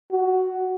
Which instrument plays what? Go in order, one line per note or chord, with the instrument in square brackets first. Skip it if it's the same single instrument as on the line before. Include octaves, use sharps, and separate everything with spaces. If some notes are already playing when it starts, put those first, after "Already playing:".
[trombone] F#4